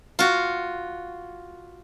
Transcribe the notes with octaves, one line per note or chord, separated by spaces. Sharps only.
F4 F#4